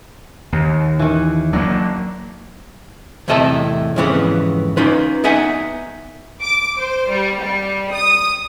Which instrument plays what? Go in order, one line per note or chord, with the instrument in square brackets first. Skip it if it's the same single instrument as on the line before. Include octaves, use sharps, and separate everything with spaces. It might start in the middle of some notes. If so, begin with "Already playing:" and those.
[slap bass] D#2
[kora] D#3 E3
[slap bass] F#3 A#3 [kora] D4
[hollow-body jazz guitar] E2 A2 C3 D#5 E5 A5
F2 G#2 C#3 E3 B3
C#4 D#4 F4 B4
B3 D#4 E5 F#5 G#5
[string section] D6
C5
G3
G3
D#6